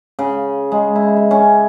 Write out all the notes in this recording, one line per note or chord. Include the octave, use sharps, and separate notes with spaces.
C#3
G#3
E4
E5
C#4